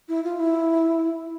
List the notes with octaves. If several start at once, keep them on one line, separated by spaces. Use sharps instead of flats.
E4
F4
E4